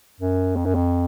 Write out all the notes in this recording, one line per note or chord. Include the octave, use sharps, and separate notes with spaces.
F#2
F2
F#2
F2